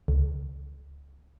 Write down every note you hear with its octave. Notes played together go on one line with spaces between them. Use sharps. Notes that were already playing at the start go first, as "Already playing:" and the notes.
C#2